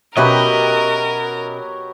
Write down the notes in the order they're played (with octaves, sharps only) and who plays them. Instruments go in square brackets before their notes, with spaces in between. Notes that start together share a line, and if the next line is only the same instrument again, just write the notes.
[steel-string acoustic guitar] B2 C#4 E5 [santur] F#3 G4 B4 [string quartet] A#4 [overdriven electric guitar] D#5